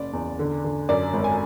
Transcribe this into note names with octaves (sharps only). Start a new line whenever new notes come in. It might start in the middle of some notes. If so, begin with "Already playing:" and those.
Already playing: F#1 D5
E2
D3
D3
F#2 D5
G#1
G#5